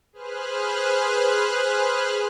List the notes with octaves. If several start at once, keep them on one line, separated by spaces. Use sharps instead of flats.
G#4 B4 C5 F6 F#6